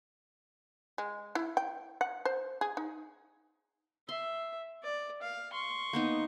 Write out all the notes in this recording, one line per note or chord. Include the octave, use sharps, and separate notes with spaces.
G#3
E4
G5
F#5
C5
G#4
D#4
E5 C6
D5
F5
C6 C#6
A#3 B3 D#4